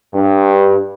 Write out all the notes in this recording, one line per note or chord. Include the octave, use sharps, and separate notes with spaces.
G2